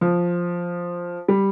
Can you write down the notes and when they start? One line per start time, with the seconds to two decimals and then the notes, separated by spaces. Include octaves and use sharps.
0.01 F3
1.28 G3